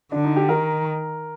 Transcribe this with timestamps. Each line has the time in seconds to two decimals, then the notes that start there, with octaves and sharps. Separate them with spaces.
0.12 D3 D4
0.25 D#4
0.36 G4
0.49 D#3 A#4